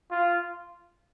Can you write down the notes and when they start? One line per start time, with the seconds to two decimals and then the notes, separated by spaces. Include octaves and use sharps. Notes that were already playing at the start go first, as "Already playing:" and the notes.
0.11 F4